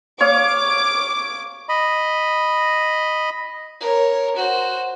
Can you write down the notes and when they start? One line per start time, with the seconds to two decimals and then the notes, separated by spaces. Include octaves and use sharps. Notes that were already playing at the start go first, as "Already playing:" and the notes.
0.21 C#5 F5 D6 D#6
1.69 D#5 B5
3.80 A#4 C#5
4.36 F#4 C5